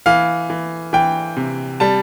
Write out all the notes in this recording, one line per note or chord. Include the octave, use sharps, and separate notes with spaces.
E3 F5
E3
E3 G5
C3
G3 A5